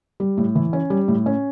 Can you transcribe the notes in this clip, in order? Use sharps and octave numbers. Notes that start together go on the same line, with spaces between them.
G3
A2
E3
C#4
G3
A2
C#4